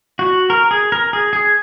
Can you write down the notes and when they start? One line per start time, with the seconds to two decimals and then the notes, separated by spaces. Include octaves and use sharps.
0.19 F#4
0.50 A#4
0.71 G#4
0.92 A#4
1.13 G#4
1.33 G#4